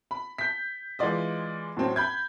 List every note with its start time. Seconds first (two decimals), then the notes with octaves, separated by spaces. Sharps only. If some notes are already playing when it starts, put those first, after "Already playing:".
0.11 B5
0.38 G6 B6
0.99 E3 G#3 F4 D5 D#5
1.77 A2 F#3 C4 C#4
1.96 B5 G6 G#6